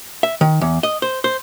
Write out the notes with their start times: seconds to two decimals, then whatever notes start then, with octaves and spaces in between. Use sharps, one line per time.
0.23 E5
0.41 D#3
0.61 E2
0.83 D#5
1.02 C5
1.24 C5